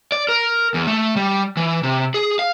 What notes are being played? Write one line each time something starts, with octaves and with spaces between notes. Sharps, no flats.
D5
A#4
E2
A3
G3
E3
C3
G#4
F5